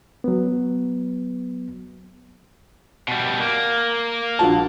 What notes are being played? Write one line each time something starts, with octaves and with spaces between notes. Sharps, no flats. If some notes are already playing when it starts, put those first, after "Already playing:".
F#3 B3
B2 G3
A#3
A#1 F#4 A5